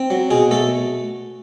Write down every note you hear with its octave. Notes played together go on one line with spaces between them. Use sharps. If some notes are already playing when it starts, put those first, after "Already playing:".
Already playing: C4
F#3
B2 G#4
A3 A4